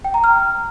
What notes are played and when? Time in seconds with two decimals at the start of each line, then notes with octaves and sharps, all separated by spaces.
0.05 G5
0.14 A#5
0.24 F6